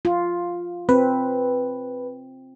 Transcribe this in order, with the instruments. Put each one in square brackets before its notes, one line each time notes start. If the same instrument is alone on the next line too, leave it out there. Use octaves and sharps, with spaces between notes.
[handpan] F4
[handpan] C4 [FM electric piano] B4